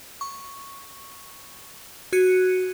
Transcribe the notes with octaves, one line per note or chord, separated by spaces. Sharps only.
C#6
F#4 F#6 G#6 C#7 D#7